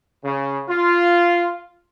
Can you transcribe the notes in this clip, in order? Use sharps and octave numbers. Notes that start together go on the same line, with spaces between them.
C#3
F4